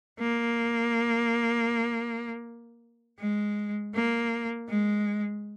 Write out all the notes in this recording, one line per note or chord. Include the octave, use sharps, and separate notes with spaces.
A#3
G#3
A#3
G#3